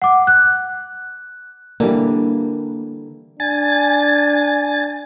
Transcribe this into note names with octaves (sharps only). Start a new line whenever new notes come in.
F#5 D6
F#6
D3 E3 G3 A#3
D4 G#5 A6